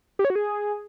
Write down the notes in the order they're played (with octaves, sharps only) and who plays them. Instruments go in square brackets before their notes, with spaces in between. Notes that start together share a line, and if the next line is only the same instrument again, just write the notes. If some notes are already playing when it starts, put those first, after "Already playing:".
[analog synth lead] G4
C#5
F#4
G#4